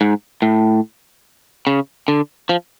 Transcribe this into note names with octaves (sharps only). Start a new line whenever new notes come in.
G#2
A2
C#3
D3
F3